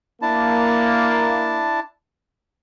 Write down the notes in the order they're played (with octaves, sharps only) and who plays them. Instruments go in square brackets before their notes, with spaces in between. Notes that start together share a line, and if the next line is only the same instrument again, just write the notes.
[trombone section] A#3 [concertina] D4 E4 A5